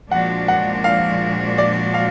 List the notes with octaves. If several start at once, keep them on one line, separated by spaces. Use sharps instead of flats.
A#2 F3 G#3 D4 F#4 F#5
F#5
F5
D5
F5